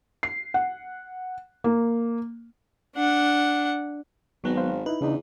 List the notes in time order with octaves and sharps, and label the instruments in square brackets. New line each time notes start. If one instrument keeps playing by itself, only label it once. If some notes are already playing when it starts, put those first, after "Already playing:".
[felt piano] C7
F#5
A#3
[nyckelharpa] D4 F#5
[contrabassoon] G#1 [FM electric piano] F#3 B3 D#4
[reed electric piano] C5 F5
[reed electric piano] D#4 E4 [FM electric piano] B4
[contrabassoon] E2 [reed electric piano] C#3 D4 D#4